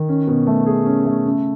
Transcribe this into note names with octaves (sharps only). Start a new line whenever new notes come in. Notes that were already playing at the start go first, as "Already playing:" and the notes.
Already playing: D#3
C#4
B2
A3
G#4
C#4
A3
C#3